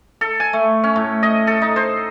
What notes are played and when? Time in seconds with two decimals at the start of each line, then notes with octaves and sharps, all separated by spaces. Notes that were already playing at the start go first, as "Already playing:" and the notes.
0.21 A4
0.40 G#5
0.53 A3
0.84 C#4
0.96 A2
1.23 D#5
1.47 A4
1.62 D#4
1.76 C5